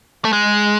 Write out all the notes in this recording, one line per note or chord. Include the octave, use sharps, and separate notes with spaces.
A3
G#3